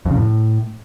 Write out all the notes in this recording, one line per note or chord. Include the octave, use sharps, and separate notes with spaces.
F2
C#3
A2